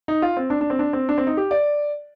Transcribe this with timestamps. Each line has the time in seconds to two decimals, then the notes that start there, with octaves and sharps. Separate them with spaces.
0.08 D#4
0.22 F4
0.37 C4
0.50 D4
0.61 D4
0.70 C4
0.79 D4
0.93 C4
1.09 D4
1.18 C4
1.27 D#4
1.37 G4
1.51 D5